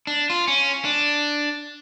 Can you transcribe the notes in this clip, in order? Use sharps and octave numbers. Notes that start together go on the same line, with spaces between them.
D4
F4
C#4
D4